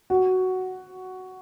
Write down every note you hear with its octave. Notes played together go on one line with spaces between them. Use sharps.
F#4